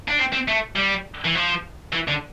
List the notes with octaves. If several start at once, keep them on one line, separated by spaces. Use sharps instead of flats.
D4
C4
C4
A3
G3
E3
F3
E3
D3